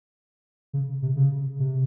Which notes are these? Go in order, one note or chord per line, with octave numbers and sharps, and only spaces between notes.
C#3
C3
C#3
C3